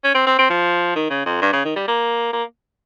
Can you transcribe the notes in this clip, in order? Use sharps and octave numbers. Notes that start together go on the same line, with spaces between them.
C#4
C4
C4
C4
F3
D#3
C#3
F2
G2
C#3
D#3
G3
A#3
A#3